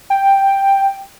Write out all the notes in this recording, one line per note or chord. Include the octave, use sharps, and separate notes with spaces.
G5